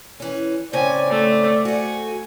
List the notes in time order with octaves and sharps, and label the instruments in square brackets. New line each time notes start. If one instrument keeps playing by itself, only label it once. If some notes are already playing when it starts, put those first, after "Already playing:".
[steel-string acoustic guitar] E3 C#4
[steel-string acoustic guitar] A2 C#3 C4 [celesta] C5 G5 [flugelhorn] D5 [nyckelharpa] G#5
[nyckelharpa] A3
[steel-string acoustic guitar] A3 F#4 [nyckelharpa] G#5